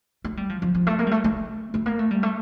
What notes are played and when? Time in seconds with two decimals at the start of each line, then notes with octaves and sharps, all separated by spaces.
0.24 A3
0.37 G3
0.49 F3
0.62 F3
0.74 F3
0.87 A3
0.99 A#3
1.07 G3
1.11 A3
1.24 A3
1.74 A3
1.86 A#3
1.99 A3
2.11 G3
2.23 A3